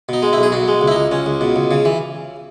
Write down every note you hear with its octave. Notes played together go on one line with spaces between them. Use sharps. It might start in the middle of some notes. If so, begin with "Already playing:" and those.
B2 D#4
G#3
E4
B1 G#4
B2 F#4
G#3
C#2
E4
C#2 D#4
C#2 C#4
C#2
B2
C#2
C#3
E3